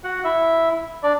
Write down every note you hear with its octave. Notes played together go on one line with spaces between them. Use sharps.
F#4 F#5
E4 E5
D4 D5